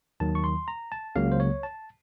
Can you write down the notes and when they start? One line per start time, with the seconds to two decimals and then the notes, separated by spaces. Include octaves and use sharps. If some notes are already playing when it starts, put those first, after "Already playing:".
0.20 D#2 D#3 F#3 A5
0.35 C#6
0.44 C6
0.68 A#5
0.92 A5
1.16 C#2 C#3 F#3 A#3 F5
1.32 C5
1.40 C#5
1.63 A5